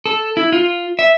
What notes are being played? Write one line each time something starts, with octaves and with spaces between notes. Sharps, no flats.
A4
E4
F4
E5